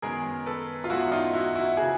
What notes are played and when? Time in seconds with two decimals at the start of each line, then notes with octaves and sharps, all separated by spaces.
0.02 F#2 D#3 G#3 B3 G#4 A#4
0.46 A4 B4
0.84 F4
0.90 F#2 D#3 G#3 B3 E4 F#4
1.12 D#4 F4
1.34 E4 F#4
1.55 E4 F#4
1.77 C#3 F3 F#4 G#4